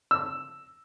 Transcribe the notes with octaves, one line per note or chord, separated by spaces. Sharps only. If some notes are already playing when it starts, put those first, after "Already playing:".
E6